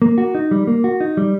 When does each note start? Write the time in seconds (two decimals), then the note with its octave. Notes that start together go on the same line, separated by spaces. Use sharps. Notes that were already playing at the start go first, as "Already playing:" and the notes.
0.02 A#3
0.18 F#4
0.35 D#4
0.51 G3
0.67 A#3
0.84 F#4
1.00 D#4
1.17 G3